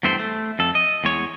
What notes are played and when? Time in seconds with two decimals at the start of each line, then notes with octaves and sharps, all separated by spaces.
0.03 E2 G2 A3 C4 C5
0.19 A3
0.59 F2 A4
0.75 D#5
1.04 E2 G#3 C#5